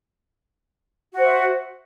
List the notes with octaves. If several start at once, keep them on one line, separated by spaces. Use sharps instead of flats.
F#4 C5 E5